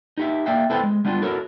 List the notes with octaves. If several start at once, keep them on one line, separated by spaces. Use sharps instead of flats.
D#4 G4 E5
A#3 D5 E5 F5 G5
B3 E4 A4 B4 C5 G5
G#3
G3 B3 D4 D#4 F4
E4 F#4 A4 A#4 C#5